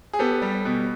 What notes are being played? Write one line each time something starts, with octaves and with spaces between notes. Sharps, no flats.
G#4
B3 G4 A4
G3
B2